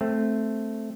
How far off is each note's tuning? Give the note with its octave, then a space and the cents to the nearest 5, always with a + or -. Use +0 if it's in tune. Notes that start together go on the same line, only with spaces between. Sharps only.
A3 +0 C4 +0